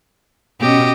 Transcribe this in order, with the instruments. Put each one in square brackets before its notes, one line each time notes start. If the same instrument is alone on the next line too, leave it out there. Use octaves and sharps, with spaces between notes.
[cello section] B2 C#4 [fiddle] G4 D#5